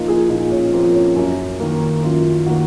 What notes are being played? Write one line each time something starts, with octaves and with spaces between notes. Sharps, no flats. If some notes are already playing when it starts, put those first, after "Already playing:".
Already playing: A#2 F3 A#3 D#4 F4
G#4
A#2 D#4
C#4
F3 A#3 C4
C#4
F#2
D#3 A#3
F#2 F4
D#3 A#3 F#4